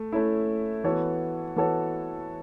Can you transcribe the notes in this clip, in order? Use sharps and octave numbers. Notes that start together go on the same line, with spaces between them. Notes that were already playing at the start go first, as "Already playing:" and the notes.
Already playing: A3
A3 C#4 E4
E3 B3 F#4 A4 C#5
E3 B3 F#4 A4 C#5